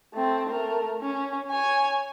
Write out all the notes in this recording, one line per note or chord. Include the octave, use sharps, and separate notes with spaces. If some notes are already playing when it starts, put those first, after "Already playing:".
A3 C4
A3 A#4
C#4
C#5 G#5